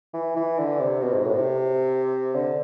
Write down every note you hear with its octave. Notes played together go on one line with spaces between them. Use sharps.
E3
E3
D3
C3
B2
G#2
A2
C3
D3